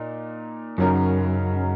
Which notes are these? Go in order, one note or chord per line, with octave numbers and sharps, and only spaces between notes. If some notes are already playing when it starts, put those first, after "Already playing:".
Already playing: A#2 D#4
F#2 C#3 F#3 D#4 A#4